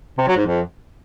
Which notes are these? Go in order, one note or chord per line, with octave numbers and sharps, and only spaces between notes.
C3
F#3
G#2
F2